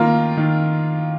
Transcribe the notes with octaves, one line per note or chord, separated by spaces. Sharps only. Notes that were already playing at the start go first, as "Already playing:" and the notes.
Already playing: D#3 A#3 F4 A#4
D#3